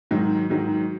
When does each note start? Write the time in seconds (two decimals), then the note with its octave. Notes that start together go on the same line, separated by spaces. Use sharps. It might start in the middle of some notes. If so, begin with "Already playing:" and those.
0.11 G#2 D#3 F#3
0.50 G#2 D#3 F#3